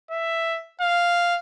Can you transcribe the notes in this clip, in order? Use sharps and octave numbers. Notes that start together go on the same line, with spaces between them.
E5
F5